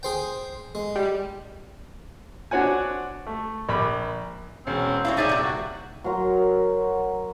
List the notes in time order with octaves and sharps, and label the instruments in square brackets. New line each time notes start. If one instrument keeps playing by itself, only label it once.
[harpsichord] G#4 C5 G5
G#3
[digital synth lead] G3
[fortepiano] C4 D4 F#4 C#5 F#5 G#5
A3
A#1 B5 D6
[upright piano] E1 C#4 [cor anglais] C4
[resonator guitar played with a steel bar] C4 D5 F5 [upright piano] E4 C#5
[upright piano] D#1 E5 A6 [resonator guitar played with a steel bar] D#4 G#4 C5 [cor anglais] D5
[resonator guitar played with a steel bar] G2 C3
[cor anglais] F#4
[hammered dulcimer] F#3 A#4 A#5 C6